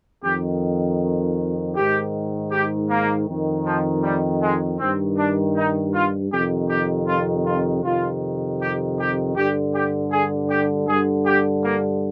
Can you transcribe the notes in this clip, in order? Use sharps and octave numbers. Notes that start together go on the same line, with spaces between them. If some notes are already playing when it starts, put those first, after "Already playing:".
F2 D#3 G4
G#2 D#3 G4
G4
A#3
F2 D#3
F3
G3
G#3
G2 D#3 C4
D4
D#4
F4
F2 C3 D#3 G4
G4
F4
F4
F2 C3 D#3 F4
G4
G4
G2 D3 G4
G4
G#4
G4
G2 D3 G#4
G4
A#3